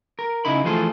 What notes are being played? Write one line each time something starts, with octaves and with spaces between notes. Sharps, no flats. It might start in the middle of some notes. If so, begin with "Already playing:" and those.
A#4
C#3 D#4 E4 B5
E3 F3 A3 F4 G#4 A4